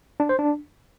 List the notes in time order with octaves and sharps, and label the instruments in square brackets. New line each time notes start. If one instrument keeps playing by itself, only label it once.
[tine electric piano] D4
C5
D4